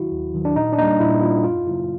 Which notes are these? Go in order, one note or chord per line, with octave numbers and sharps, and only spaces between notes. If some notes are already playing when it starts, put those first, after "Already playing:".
Already playing: D#3 F#3 E4 F#4
D#2
D#3 F#3
D4
A#2 D#4
D4
G3 A#3 D#4
A#2 E4
G3 A#3 F4
F#2 F4
C#3 F#3 A#3 E4